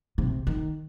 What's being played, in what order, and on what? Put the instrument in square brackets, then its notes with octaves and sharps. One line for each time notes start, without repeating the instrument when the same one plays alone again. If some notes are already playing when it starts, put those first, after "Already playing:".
[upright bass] C3
D#3